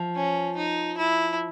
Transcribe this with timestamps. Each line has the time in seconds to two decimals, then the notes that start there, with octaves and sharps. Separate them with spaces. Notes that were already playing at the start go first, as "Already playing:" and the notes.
Already playing: F3
0.16 C#4
0.57 D#4
0.98 E4